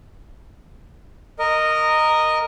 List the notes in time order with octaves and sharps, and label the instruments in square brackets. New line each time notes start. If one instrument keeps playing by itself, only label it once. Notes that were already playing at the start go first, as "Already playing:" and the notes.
[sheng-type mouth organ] A#4 D#5